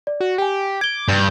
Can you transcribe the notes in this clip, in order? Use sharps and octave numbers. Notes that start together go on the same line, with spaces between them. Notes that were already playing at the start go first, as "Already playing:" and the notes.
D5
F#4
G4 G5 G#5
D6 G#6 G7
G2 G6